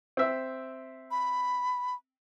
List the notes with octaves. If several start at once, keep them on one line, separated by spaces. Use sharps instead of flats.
C4 E5
B5